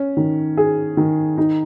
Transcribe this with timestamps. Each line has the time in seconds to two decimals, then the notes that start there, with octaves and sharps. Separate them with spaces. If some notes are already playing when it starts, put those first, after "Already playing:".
Already playing: C#4
0.17 D#3
0.57 G#4
0.97 D#3
1.38 D#4